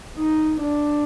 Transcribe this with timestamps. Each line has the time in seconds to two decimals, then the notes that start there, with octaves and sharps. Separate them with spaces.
0.18 D#4
0.62 D4